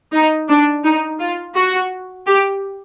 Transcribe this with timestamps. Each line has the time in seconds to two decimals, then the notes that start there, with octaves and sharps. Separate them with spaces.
0.13 D#4
0.48 D4
0.83 D#4
1.19 F4
1.55 F#4
2.26 G4